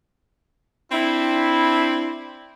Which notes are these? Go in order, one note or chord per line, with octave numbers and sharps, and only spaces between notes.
C4 D4 E4